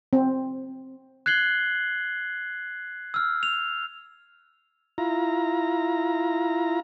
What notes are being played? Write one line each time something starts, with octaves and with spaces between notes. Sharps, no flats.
C4
F#6 G#6 C7 F#7 G7
E6 F6
F7
E4 F4 A#5